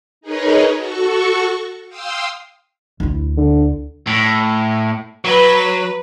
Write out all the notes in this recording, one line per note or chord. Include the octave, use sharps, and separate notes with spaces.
D#4 G#4 A#4 B4 C#5 D#5
F#4 A4 C#6
F5 G5 C6 D#6 E6
D2 E4
D3
A2
F#3 B4